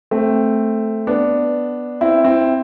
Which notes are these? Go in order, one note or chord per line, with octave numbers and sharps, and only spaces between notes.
A3 C4
B3 D4
C4 E4
C4 E4